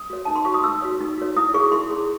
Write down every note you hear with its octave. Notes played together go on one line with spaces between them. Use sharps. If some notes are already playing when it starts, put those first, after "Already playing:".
Already playing: D#6
F#4 C#5
D#4 A5
C6
F#4 C#5 C#6
D#6
D#4 E6
F#4 C#5
D#4
F#4 C#5
E4 D#6
G#4 C#5 C#6
E4 C6
G#4 C#5